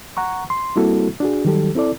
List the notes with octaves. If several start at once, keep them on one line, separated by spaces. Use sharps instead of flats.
F#5 A#5 C#6
C6
G3 A#3 C4 E4 F#4 A4
D4 F#4 G#4
D#3 F#3 G3 G4 A4
C4 E4 A4 D5